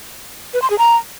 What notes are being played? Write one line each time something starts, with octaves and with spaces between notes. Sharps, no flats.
B4
C6
G#4
A#5